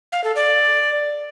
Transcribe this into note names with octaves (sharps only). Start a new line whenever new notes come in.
F5
A4
D5